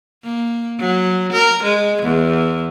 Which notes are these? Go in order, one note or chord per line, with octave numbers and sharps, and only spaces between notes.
A#3
F#3
A#4
G#3
E2